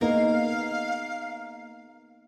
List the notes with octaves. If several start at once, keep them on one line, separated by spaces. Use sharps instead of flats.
A#3 B3 D#4 G#4 A#4 F5